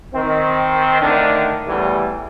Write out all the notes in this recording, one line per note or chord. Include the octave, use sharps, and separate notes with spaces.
D#3 C4
A2 D3 D#3 D4
E2 A2 E3 G3